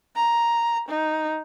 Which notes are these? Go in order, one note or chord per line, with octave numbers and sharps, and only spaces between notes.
A#5
D#4